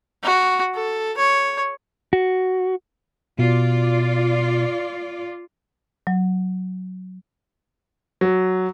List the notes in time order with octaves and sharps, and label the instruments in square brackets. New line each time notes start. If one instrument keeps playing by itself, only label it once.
[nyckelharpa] F#4
A4
C#5
[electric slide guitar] F#4
[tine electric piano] B2 [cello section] F4 D5
[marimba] F#3
[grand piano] F#3